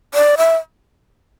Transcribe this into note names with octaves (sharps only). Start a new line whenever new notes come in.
D5
E5